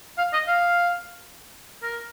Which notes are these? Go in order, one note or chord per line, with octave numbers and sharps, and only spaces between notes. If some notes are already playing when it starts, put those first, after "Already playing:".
F5
D#5
F5
A#4